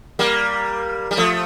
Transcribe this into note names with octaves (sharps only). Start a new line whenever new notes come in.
G3 A#3
G3
F3 A3